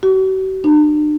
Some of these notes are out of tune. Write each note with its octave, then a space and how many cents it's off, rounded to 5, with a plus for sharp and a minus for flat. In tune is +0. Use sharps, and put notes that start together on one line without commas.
F#4 +45
D4 +40